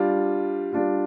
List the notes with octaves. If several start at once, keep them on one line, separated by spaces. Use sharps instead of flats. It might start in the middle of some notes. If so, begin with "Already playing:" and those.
Already playing: G3 D4 F4
G3 D4 F4